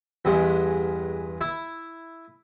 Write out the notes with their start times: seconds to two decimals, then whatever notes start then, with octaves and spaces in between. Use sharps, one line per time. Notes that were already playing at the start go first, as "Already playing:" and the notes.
0.25 E2 G2 G#3
1.41 E4